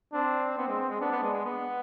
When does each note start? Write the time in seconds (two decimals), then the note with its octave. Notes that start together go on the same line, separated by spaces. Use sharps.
0.13 C4 D4
0.57 B3 C4
0.68 G#3
0.90 G#3
1.00 B3 D4
1.11 B3
1.23 G#3
1.33 G#3
1.45 B3